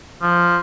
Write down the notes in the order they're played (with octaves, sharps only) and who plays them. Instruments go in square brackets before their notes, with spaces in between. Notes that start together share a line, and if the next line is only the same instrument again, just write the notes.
[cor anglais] F3